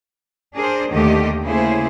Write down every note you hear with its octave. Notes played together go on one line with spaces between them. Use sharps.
D4 G#4 A#4 C5
D#2 D3 D#3 A3 G4 D#5
C#3 A3 A#3 E4 G#4 C5